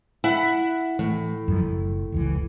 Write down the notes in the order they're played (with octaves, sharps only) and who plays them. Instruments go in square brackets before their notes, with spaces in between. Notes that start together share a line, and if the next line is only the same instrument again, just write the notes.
[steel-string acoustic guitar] E4 E5 F#5
[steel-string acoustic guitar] A2 [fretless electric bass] E3
[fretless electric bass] F#2 F3
F#1
F1 C#2 E3